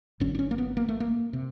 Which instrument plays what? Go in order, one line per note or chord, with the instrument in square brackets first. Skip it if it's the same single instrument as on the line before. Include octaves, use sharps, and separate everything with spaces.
[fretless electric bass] G#1 F#2 D3 C#4
D4
C#4
A#3
B3
A#3
A3
A#3
C3